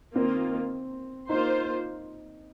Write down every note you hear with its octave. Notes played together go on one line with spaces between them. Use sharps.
D#3 A#3 C4 F4
A#3 D#4 F4 C5